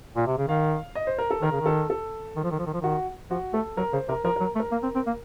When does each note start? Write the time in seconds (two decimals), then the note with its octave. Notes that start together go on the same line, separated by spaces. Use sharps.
0.16 A#2
0.27 C3
0.38 C#3
0.48 D#3 F5
0.95 D#5
1.07 C5
1.19 A#4
1.31 A4
1.42 D#3 A#4
1.52 C#3
1.61 D#3 A4
1.90 A4
2.36 D#3
2.44 F3
2.51 D#3
2.59 F3
2.67 D#3
2.74 F3
2.81 D#3 F#4
3.30 F3 F#4
3.54 A3 A4
3.77 F#3 A#4
3.93 C#3 C5
4.09 C3 A#4
4.25 F3 A#4
4.36 F#3 A#4
4.55 A3
4.60 A#4
4.72 A#3
4.83 C4
4.95 C4
5.07 A#3